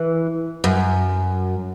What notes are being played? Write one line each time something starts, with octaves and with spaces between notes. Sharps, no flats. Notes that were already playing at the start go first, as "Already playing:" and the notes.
Already playing: E3
F#2